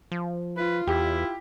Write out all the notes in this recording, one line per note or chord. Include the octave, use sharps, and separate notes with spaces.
F3
F4 B4
E2 E4 G4